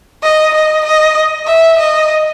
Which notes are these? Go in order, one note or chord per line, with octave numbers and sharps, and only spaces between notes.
D#5
D#5
D#5
E5
D#5